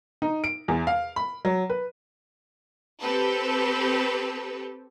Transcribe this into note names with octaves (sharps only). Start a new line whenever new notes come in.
D#4
D7
E2
F5
B5
F#3
B4
C4 G4 A4 B4